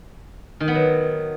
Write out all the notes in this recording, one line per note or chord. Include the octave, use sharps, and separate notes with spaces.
D#3
B3
F#3